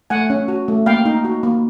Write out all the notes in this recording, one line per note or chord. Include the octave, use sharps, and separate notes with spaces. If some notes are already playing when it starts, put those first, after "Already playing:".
A3 F#5 G#5
C#4
F#4
A3
A#3 F5 G5
D#4
F#4
A#3